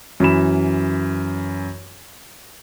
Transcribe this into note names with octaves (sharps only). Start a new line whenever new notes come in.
F#2 E3 B5 E7